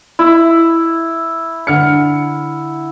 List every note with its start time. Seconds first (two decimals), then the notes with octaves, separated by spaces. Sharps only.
0.19 E4
1.67 D3 F6 C#7